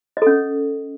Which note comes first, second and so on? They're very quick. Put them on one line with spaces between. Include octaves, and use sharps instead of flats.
D#5 A4 C#4